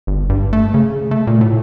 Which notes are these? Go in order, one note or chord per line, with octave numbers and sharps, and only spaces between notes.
G1
G2
A3
C#3
A3
A#2
A2